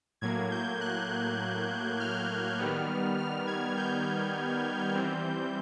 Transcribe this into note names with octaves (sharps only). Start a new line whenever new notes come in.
A2 F#3 A#3 G#6
G6
F#6
F6
D#3 G3 B3
F6
G#6
G6
E3 G3 C4